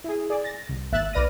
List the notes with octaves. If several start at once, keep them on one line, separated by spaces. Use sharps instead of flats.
E4 G#4
G#4 D5
A6 A#6
C2
G#1 A#3 E5 F#6 A6
B1 B4 D5 F6 A#6 D#7